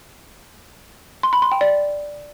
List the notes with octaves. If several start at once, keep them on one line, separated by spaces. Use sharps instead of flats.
C6
B5
C6
G5
D5